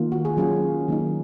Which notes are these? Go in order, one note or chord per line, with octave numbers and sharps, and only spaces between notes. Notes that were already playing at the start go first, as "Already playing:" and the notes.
Already playing: D#3 A#3 F4
F#4
G#4
F#3 C#4 F4 G#4
D#3 F#3 A#3 D#4